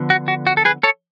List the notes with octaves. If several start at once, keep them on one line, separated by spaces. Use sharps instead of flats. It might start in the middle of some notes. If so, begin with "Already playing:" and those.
Already playing: D3 F3 B3
F#4
F#4
F#4
A4
G#4 B4
A4 C#5